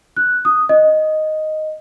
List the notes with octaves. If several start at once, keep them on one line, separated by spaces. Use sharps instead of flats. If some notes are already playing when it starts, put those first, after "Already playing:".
F#6
D#6
D#5